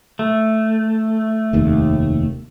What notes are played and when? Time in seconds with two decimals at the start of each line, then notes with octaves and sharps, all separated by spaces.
0.19 A3
1.53 F1 D#2